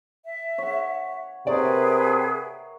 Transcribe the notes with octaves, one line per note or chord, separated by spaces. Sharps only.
E5
C#5 F#5
C3 G#4 A#4 B4 C#5 D5 E5 G5